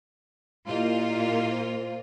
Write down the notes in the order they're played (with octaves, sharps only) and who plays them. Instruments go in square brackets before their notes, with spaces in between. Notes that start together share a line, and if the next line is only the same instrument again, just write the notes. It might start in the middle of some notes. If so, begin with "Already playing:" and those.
[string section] A#2 A#3 F4 [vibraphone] E4 G4 D#5
[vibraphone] C5